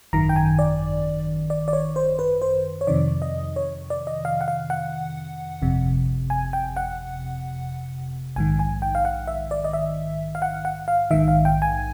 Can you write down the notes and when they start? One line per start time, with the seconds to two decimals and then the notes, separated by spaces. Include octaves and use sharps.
0.13 G#1 F#2 D#3 A#5
0.29 G5
0.36 G#5
0.59 D5
1.50 D5
1.68 D5
1.73 C#5
1.96 C5
2.19 B4
2.42 C5
2.81 C#5
2.87 F2 C3 D#3 D5
3.22 D#5
3.56 C#5
3.90 D5
4.07 D#5
4.25 F5
4.41 F#5
4.48 F5
4.70 F#5
5.62 G1 F2 C3
6.30 G#5
6.53 G5
6.77 F#5
8.36 A#1 G#2 D#3 G#5
8.59 G#5
8.82 G5
8.95 F5
9.05 F#5
9.27 E5
9.51 D5
9.64 D#5
9.73 E5
10.35 F5
10.42 F#5
10.65 F#5
10.88 F5
11.11 A#1 G#2 D#3 E5
11.28 F5
11.45 G5
11.62 G#5